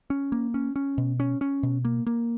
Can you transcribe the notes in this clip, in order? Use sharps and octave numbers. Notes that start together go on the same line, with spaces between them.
C#4
A#3
C#4
C#4
B2
C#4
C#4
B2
A#3
A#3